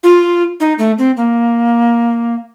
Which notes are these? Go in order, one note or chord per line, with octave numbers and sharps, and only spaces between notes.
F4
D#4
A3
C4
A#3